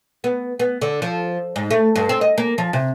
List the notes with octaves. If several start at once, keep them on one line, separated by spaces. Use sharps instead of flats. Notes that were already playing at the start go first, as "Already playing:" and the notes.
B3
B3
D3
F3
G#2
A3
G2
C4
D#5
A#3
F3
C3